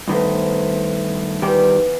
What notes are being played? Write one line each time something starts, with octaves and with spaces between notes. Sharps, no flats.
G2 D#3 A3 B3 C5
D#3 E3 G3 G4